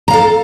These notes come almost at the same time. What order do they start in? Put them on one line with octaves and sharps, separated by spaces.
A#5 F5 A4